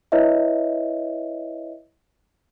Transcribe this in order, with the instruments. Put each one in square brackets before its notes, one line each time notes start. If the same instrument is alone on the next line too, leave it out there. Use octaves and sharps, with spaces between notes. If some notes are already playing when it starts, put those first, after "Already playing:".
[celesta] E4 B4 C#5 D#5 E5